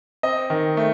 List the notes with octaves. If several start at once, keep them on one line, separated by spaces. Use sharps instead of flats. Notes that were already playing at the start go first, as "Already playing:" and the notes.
C4 D#5
D#3
A3